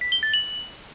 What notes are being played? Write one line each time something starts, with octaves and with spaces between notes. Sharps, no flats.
B6
G7
A6
F#7